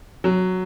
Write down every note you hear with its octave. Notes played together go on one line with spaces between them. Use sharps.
F#3